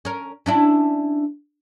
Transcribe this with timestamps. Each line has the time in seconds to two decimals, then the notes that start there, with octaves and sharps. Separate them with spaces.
0.05 C#4 A#4
0.46 C#4 D4 E4